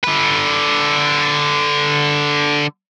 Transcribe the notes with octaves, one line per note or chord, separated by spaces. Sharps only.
D3 B4